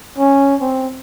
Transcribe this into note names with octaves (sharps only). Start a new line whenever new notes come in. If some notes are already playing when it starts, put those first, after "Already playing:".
C#4
C4